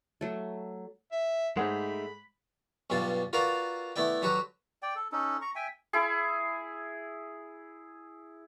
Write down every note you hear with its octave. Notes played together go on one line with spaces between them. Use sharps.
F#3 A3
E5
G#2 G#3 A3 D#4 G#4 C#5 F#5 B5
B1 G2 B2 G3 F4 D5
F4 F#4 A#4 B4 D5 F5
A3 B3 E4 D5 G5
D3 F#3 F#4 G4 B4
D5 G5
A4
C#4 D#4 A4
A#5 C#6
E5 G5 G#5
E4 G#4